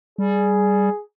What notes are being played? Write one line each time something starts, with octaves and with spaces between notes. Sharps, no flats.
G3 G#4